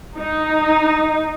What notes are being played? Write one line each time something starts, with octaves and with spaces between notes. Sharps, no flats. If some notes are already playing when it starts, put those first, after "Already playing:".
D#4